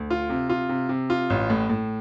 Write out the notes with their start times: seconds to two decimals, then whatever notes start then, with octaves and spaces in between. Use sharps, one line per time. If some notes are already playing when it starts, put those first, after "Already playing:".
Already playing: D2
0.10 F4
0.30 C3
0.50 F4
0.69 C3
0.89 C3
1.10 F4
1.30 A1
1.50 A2
1.70 A2